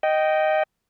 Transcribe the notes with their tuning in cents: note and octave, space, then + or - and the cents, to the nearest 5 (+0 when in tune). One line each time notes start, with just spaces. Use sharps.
D#5 +0 G5 -15